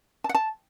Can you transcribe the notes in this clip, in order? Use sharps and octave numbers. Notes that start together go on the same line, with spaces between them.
A5
F#5
A5